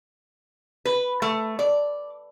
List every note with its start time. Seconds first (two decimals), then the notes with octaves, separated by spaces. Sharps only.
0.85 B4
1.22 A3
1.59 D5